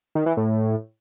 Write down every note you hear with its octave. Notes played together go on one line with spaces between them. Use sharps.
D#3
E3
A2